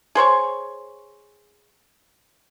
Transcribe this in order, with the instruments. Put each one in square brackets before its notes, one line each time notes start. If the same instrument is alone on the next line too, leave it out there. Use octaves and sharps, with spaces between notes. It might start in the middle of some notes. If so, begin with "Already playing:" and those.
[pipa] G#4 C5 C#5 C#6